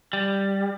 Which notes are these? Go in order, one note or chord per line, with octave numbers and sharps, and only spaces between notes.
G3